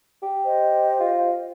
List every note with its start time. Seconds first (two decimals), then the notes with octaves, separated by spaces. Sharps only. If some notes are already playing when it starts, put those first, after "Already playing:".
0.23 G4
0.46 C5 D#5
1.00 F4